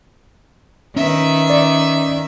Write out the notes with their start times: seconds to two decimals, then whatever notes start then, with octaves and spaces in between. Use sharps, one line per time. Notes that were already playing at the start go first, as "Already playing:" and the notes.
0.96 D#3 C#4 B4 E5
1.50 D5